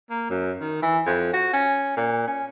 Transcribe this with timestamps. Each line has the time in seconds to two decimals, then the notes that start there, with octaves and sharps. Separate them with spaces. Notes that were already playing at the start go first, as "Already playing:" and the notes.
0.11 A#3
0.30 F#2
0.61 D#3
0.82 E3
1.06 F2
1.33 F#4
1.53 C#4
1.97 A#2
2.28 C#4